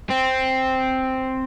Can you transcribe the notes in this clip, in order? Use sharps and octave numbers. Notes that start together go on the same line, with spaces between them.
C4